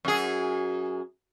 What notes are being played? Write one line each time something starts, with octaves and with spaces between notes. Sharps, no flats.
F#2 G#4